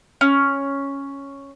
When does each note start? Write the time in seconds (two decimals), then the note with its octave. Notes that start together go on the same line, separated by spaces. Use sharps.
0.21 C#4